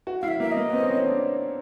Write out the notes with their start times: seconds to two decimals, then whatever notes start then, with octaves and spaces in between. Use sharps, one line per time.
0.07 F#4
0.21 E4 F5
0.28 E5
0.40 A#3 E5
0.52 D#5
0.57 A#3
0.70 B3
0.73 C4
0.83 C#4
0.90 C4
1.07 D4